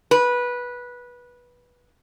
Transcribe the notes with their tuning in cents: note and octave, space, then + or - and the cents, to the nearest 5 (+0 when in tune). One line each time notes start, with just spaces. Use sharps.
B4 -15